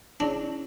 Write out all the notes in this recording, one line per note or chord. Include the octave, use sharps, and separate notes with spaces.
C#4 D4 E4 G#4 C#5